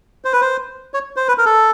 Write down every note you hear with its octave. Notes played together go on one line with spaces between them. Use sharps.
C5
B4
C5
C#5
C5
B4
A#4
A4